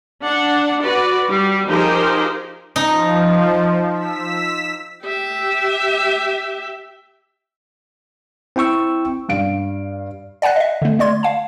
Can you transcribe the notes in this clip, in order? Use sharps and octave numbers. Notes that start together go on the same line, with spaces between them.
D4 F#5
F#4 B4 D5
G3
F3 D#4 G4 G#4 A#4 C5
F3 D#4
E6 B6
G4 E5
C4 E4 G5 C#6 E6
G2 F5 D7
D5 F#5 G#5 F#6 A#6
D#5 E5
D3 A3
A3 D5 C6 G#6
F5 A5